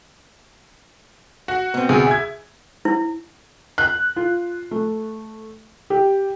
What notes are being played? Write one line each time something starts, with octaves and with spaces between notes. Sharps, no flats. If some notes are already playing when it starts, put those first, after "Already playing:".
F#4
B2 C4
D2 G#4
E5 G#6
E4
F#6
F4
A3
G4